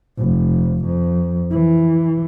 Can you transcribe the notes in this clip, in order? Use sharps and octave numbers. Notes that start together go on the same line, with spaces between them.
F1
F2
E3